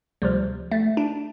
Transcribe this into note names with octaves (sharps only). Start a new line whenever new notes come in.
D2 C3 F3 G3
A3
D4